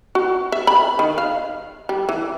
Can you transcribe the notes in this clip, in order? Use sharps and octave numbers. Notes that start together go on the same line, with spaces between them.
F#4
E5
B5
D#3
F5
G3
E3